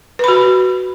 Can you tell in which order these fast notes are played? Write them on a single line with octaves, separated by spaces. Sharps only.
B4 B5 F#4